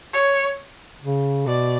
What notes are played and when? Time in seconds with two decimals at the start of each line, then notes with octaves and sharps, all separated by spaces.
0.14 C#5
1.02 C#3
1.47 B2 D5